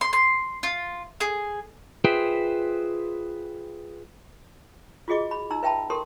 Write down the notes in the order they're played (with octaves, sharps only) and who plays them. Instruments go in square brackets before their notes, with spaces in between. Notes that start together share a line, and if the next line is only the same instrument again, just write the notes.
[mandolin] C6
C6
F4
G#4
[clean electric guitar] F4 G#4 B4 C5 E5 G5
[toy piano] F4 F#4 G#4 D#5 D6
B5
D#4 A#5 E6
B4 E5 G5 A5 B5
G4 A4 A#4 C6 D#6